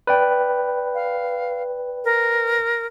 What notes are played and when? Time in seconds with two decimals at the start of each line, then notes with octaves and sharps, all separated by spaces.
0.07 B4 D5 G5
0.94 F5
2.04 A#4